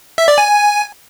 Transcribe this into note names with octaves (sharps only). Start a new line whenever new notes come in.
E5
D5
G#5